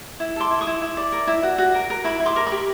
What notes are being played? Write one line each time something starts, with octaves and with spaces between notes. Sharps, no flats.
E4
A4 C6 D6
E4
C#6 D#6
E4
E4
D5
A#4
E4
F#4
F#4
A#4
A#4
E4 B5 C#6
E4
C6 D6
A#4
B5 C#6
G4